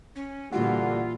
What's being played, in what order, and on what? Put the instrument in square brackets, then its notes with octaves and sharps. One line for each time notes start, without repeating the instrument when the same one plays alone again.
[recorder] C#4
[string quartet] A#2 E3 [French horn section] D3 G3 [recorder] F4 [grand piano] F#4